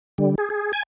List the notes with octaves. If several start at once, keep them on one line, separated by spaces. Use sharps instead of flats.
D3 G3
G#4
G#4
G#5